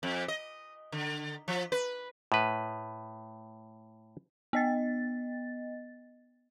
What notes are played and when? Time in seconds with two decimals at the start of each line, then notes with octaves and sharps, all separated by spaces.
0.03 F2
0.28 D#5
0.92 D3
1.48 F3
1.72 B4
2.32 A2 B4
4.53 B3 D#5 A6